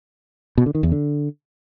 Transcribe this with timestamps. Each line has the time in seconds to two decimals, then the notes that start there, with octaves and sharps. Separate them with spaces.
0.58 B2
0.66 D3
0.75 D#3
0.83 E2
0.92 D3